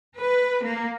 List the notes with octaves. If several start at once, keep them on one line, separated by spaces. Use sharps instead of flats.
B4
A#3